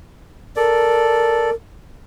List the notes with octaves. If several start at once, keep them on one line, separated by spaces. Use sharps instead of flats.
A4 A#4 D5